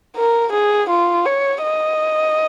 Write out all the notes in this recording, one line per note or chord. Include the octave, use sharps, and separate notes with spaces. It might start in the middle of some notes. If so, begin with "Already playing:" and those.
A#4
G#4
F4
C#5
D#5